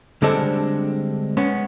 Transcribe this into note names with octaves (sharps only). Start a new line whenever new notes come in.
D3 G3 G#3 C4 D4 A4
G#3 B3 C#4